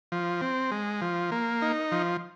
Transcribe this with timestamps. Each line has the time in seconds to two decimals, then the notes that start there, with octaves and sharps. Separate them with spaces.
0.12 F3
0.41 C4
0.71 G#3
1.01 F3
1.31 A#3
1.62 D#4
1.92 F3